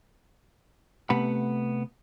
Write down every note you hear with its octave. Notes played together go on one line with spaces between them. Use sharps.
C3 A3 B3 F#5 B5